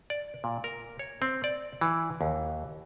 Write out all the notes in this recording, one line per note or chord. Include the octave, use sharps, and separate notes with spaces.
D5
A#2
A#4
C#5
C4
D5
E3
D#2